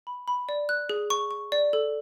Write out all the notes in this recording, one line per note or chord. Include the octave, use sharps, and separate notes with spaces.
B5
B5
D5
F#6
G#4
C#6
C#6
D5
A4